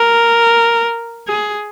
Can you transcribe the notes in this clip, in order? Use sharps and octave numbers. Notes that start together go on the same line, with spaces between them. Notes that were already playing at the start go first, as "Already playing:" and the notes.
Already playing: A#4
G#4